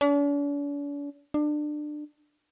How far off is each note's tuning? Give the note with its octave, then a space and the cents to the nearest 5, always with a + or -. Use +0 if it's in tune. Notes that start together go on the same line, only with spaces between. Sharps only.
D4 -45
D4 +25